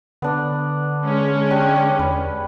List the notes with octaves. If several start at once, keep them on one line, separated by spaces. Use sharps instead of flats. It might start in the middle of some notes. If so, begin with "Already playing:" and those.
D3 B3 D4 D5
G#3 C#4
G3 D4 G4
E2 B4